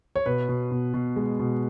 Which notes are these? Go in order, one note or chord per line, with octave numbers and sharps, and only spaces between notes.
C#5
B2 B4
B2
B2
B2
G#3
B2